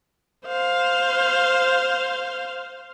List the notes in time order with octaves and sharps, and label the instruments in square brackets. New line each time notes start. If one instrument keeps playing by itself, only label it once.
[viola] C5 F5